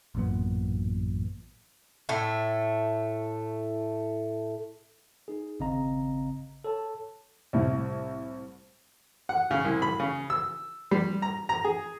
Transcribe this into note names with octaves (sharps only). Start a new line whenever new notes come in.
A1 F#2 A#2 B3
A2 A3
D#4 G#4
G#1 C#3 C4 D#5 F5 A#5
A4 C#5 A5
C2 A2
F#5
C#3
C2
B5
C#3
E6
G3
A#5
A#5
G#4